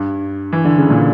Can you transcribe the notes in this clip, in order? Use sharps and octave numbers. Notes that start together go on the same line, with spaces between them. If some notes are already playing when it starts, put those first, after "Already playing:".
Already playing: G2
E3
D3
C#3
A#2